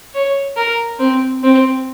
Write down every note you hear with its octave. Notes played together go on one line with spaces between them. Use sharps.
C#5
A#4
C4
C4